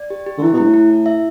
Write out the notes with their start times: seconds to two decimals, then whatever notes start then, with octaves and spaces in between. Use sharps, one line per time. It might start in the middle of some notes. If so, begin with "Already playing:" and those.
Already playing: D5
0.10 G4
0.27 G4
0.38 D3
0.42 E3 E4
0.53 B2
0.58 G2 E4
0.63 A2
0.74 E4
0.90 E4
1.06 E5